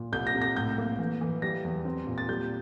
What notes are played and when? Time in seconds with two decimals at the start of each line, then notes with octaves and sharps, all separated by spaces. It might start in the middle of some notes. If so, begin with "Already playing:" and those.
Already playing: A#2
0.12 C2 G6
0.27 A#6
0.35 C3
0.42 A#6
0.56 A2 G6
0.78 A#3
0.99 E3
1.21 E3
1.42 G3 A#6
1.64 E2
1.85 C4
2.07 A#2
2.18 A6
2.29 G3 G6